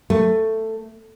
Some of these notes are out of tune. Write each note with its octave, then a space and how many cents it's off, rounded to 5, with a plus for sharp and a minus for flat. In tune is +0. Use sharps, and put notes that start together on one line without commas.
A3 +10